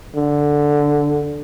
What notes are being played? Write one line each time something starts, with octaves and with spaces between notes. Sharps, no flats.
D3